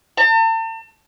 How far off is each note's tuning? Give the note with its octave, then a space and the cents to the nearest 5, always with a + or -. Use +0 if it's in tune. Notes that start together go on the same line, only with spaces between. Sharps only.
A5 +40